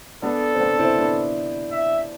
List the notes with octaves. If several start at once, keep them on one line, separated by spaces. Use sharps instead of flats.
B3 D4 A4
C4
B3 D4
C4 E4
B3 D4
E5